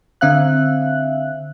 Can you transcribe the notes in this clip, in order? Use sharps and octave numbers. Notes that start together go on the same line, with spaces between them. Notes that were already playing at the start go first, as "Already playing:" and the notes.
D3 C4 E5 F5 F#6